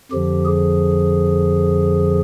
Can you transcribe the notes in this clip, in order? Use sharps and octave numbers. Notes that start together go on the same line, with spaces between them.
F2 D3 F3 G4
G#4